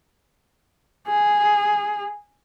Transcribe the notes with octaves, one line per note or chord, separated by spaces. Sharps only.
G#4